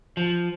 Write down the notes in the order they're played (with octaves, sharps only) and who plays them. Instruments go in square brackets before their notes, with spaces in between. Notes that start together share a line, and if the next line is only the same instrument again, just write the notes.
[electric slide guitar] F3